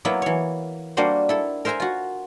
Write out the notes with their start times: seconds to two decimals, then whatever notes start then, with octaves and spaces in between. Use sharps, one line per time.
0.05 F#3 A#3 B3 E4
0.22 E3 C#5
0.97 G3 A#3 D4 F#4 C5 F#5
1.29 E4 A4
1.65 A#4 C5 E5 G#5 A#5
1.80 F4 F#4